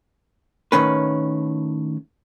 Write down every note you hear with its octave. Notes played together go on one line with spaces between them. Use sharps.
A2 D#3 C#4 B4